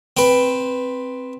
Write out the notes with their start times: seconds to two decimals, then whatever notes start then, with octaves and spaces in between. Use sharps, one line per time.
0.17 C4 B4